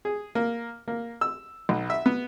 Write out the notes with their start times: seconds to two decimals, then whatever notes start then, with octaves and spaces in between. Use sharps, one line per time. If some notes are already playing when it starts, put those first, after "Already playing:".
0.05 G#4
0.35 A#3
0.88 A#3
1.21 E6
1.69 B1
1.90 E5
2.06 B3